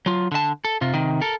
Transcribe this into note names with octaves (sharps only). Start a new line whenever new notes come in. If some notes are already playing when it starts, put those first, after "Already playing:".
F#3 F4
D3 A5
A4
C3 F4
C3 D#3
A4 A#4